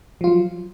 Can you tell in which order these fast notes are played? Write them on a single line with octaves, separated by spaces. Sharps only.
F3 F4 F#3